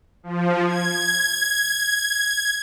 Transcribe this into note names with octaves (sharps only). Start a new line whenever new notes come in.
F3
G#6